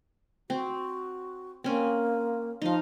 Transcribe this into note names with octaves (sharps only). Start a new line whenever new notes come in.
C4 F#4
A#3 C4 C#4
F3 D#4 F5